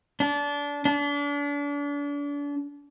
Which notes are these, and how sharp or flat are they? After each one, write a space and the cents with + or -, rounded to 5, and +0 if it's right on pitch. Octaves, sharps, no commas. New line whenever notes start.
D4 -25
D4 -35